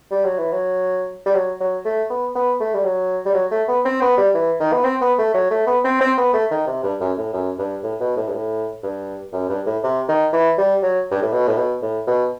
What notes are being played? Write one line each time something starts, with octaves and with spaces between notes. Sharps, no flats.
G3
F#3
E3
F#3
G3
F#3
F#3
A3
B3
B3
A3
G3
F#3
G3
F#3
A3
B3
C4
B3
G3
E3
D#3
B3
C4
B3
A3
F#3
A3
B3
C4
C4
B3
A3
D#3
C3
G2
F#2
A2
F#2
G2
A2
B2
A2
G2
A2
G2
F#2
G2
A2
C3
D#3
E3
G3
F#3
G2
A2
B2
A2
B2
A2
B2